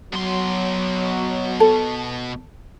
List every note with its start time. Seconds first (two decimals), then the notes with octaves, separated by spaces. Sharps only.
0.13 B2 F#3 C6
1.60 A4